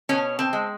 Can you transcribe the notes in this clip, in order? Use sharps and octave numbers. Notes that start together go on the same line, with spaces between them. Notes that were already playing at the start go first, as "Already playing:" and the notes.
B2 C#4
C4
G#3